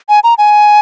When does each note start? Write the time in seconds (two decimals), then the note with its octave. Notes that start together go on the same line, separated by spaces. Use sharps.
0.09 G#5
0.24 A#5
0.38 G#5